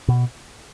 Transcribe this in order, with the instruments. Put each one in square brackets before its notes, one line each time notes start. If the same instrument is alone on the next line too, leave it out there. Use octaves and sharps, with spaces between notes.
[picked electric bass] B2